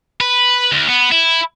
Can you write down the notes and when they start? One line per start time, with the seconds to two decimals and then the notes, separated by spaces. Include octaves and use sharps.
0.20 B4
0.72 D2
0.89 B3
1.12 E4